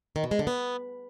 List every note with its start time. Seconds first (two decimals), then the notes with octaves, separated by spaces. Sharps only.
0.16 D#3
0.24 B2
0.31 G#3
0.39 D3
0.47 B3